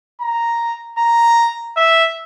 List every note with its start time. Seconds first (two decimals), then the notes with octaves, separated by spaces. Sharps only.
0.20 A#5
0.98 A#5
1.77 E5